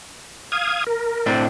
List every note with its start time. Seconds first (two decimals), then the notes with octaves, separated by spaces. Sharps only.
0.52 F5 D#6 G#6
0.87 A#4
1.26 A2 C4 D4